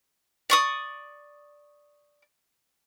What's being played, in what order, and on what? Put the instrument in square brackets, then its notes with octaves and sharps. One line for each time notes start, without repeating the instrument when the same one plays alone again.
[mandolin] D5 C#6 D#6